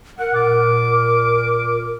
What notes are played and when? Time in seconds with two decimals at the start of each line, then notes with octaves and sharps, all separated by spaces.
0.19 A#4 F#5
0.34 A#2 D6